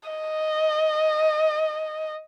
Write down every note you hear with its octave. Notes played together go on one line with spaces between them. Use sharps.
D#5